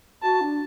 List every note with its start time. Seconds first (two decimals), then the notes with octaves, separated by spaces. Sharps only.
0.22 F#4 A5
0.40 D4